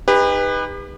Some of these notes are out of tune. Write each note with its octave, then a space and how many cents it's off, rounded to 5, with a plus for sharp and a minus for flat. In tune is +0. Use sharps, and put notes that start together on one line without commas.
D#4 +0 G4 +45 B4 +0